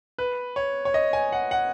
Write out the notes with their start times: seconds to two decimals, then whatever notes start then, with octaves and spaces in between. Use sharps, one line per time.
0.18 B4
0.56 C#5
0.85 C#5
0.94 D#5
1.13 G#5
1.32 F#5
1.51 F#5